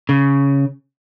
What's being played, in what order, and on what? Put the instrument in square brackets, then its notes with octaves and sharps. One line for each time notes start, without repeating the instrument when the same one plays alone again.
[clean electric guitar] C#3